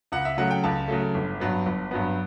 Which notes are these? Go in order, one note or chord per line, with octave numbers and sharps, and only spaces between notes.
C#2 F#5
E5
C#3 F#3 A3 F#5
G5
C#2 A5
C#3 F#3 A3
G1
G2 F#3 B3
G1
G2 F#3 B3